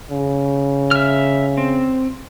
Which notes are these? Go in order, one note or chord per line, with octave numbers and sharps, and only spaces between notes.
C#3
E5 F6
C4